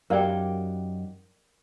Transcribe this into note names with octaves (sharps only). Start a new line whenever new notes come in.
F#2 D#4 F#4 G4 A#4 D5 F5 G5